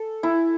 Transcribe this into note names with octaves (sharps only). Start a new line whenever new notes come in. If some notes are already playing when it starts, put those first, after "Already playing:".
Already playing: A4
E4